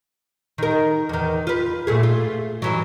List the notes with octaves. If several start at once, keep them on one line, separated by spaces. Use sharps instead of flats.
D#3 A#4
E2 D#3
F4 B4
A#2 A3 G#4
F4
G2 E3 F#3